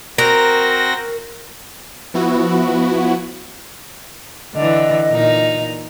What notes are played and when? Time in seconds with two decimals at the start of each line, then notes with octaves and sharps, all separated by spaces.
0.18 C4 F#4 A#4 A#6
2.14 F3 B3 E4 F#4
4.55 D3 E3 D#5
5.11 A#2 D#4